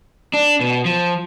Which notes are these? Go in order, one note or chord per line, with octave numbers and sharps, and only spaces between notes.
D4
B2
F3